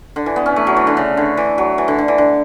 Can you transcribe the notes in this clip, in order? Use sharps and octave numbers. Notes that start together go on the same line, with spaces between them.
D3
E3
B3
C#4
A3
F#3
E3
D3
C#3
D3
E3
F#3
E3
D3
D3
E3
D3